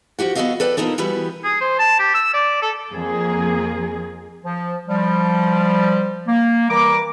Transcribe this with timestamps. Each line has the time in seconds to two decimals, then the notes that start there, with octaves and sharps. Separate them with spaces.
0.19 F3 F#4 G4 F#5
0.35 B3 F#4 G4 A4 D#5 F5
0.60 A4 B4 D5 G5
0.77 B2 F3 A#3 D#4 A4
0.98 E3 G3 B3 F#4 G4
1.44 G#4
1.61 C5
1.79 A5
1.99 G4
2.14 E6
2.34 D5
2.62 A4
2.93 F2 A#3 G#4
4.44 F3
4.88 F3 G3
6.27 A#3
6.69 E3 G3 A#4 D6